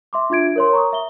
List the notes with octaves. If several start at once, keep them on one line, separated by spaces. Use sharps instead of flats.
E5 C6 D6
D4 F4 E5 G#6 D7
A#4 C#5 C6
A#5 C#6 D#6
E5 G7